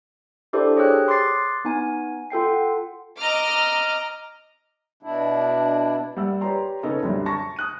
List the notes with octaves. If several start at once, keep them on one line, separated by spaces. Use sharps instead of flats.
D4 E4 G4 A4 C5 D5
G4 G#4 C#5 G5 E6 F#6
C6 D6 D#6 F#6 A6 C7
B3 D#4 G#5
F4 A4 G5 C7
F#5
D#5 A#5 D6 F6
B2 D4 E4
G3 A#3 F#5 E6
G4 B4 C#5 D5 A#5 C6
C#3 B3 C#4 D#4 A4 A#4
C2 F#2 D3 F#3 G3
A5 C#6 A#6
D#6 F#6 D#7